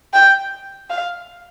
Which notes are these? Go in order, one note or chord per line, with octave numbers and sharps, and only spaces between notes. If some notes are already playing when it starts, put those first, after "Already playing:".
G5
F5